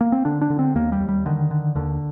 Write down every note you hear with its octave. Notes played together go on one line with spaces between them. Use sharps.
A#3
C4
D3 D4
D4
D3
C4
D#2 A#3
G3
D#2
G3
D3 D#3
D3
D#2 D3